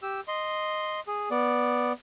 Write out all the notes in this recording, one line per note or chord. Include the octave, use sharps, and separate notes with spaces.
G4 E6
D#5 C6
G#4
B3 D5